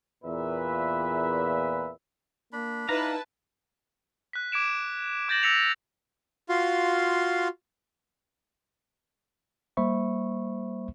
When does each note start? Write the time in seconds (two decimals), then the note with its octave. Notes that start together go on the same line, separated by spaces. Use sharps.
0.24 E2 A#2 B4 E5
2.53 A#3 D4 B5
2.89 D#4 E4 B4 F5 A5 A#5
4.33 F#6 B6
4.52 D6 G#6 D7 E7
5.29 D6 G6 A6 A#6 E7 F#7
5.43 E6 A#6 B6 C#7 F7
6.49 F4 F#4 F5 C6
9.77 G3 A#3 C5 E5 B5 C#6